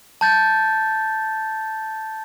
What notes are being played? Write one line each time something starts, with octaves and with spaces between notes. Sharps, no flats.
A5 G6 A6